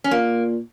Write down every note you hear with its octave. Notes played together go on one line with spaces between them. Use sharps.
C#4
A#2 A#3